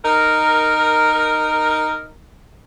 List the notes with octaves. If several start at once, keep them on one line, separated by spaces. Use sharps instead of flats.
D#4 A#4